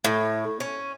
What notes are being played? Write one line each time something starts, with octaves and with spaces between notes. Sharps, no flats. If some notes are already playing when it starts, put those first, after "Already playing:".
A2
C#4